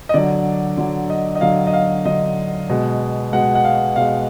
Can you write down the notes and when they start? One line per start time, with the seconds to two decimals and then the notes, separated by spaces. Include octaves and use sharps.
0.09 D#5
0.14 D3 F#3 D5
0.78 D3 F#3
1.10 D#5
1.35 D#5
1.41 D3 F#3 F5
1.67 D#5
1.73 F5
2.05 D3 F#3 D#5
2.69 B2 G#3
3.33 B2 G#3 F#5
3.55 F#5
3.64 F5
3.96 B2 G#3 F5